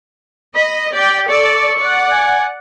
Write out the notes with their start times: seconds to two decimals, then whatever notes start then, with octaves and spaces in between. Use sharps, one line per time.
0.55 D#5 B5
0.94 G4 D5 G5
1.28 A4 D5 C#6
1.79 D5 F#5
2.11 G#5